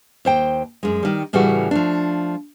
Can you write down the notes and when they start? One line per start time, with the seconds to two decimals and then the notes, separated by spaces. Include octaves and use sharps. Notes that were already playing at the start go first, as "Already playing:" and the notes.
0.25 D#2 C5 G5
0.83 F#2 G#3
1.03 D#3 G3
1.33 A2 C#3 E3 G3 A3 F#4
1.71 F3 A3 D4